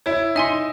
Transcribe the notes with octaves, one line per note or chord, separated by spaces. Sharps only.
E4 C#5
D#4 E5 G#5 C6